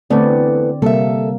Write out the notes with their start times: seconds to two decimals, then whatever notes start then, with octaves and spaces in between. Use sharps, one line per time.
0.10 E2 D3 A3 B3 C4 D5
0.82 C3 G3 A#3 A4 E5